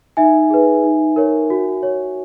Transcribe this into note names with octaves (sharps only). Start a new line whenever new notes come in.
D#4 E5 G#5
G#4 B4
D#4
A#4 C#5
F#4
C#5